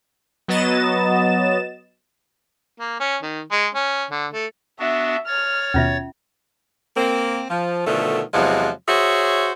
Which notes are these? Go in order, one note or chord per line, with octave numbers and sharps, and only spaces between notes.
F#3 B3 D#5 A6 E7
A#3
C#4
D#3
G#3
C#4
D3
A3
B3 D4 F#4 E5
C#5 F6 A6
D#2 B2 C#4 F4 E5
A#3 C4
F3
B2 D3 D#3 F3 A3
E2 C3 F3 F#3 G#3
F#4 G#4 C5 C#5 E5